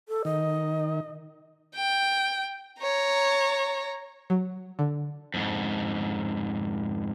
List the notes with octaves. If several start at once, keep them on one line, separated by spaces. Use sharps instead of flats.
A4
D#3 D#5
G5
C#5 A#5
F#3
D3
F2 G#2